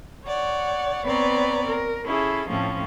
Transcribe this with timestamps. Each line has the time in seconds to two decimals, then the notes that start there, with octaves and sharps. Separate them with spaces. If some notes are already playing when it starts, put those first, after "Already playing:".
0.24 C#5 D5 F#5
1.04 B3 C4 B4 C#5 D5 A#5
1.67 A#4
2.04 C#4 E4 G#4 A4
2.47 A2 F3 A3 C4 C#4